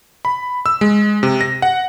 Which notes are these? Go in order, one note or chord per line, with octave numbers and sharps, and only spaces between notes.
B5
E6
G#3
C3
A#6
F#5